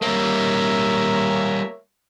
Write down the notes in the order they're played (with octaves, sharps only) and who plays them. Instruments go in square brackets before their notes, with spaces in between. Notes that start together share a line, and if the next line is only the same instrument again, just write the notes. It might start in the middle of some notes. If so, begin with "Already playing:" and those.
[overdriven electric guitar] G3 A#3 [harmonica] A#4 C#5 E5